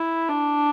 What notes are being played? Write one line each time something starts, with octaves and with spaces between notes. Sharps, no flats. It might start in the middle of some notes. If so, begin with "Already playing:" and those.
Already playing: E4
D4